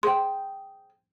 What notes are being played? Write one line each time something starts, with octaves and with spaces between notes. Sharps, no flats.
G#4 C5 G5 C6